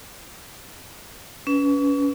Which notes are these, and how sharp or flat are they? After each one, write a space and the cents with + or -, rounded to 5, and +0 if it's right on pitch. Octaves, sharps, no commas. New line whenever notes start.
C#4 +35 B4 +0